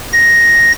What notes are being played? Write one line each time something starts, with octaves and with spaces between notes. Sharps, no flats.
A#6